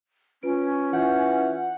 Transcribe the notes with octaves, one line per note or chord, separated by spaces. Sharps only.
C#4 F4 B4 D7
E3 F4 F#5 G6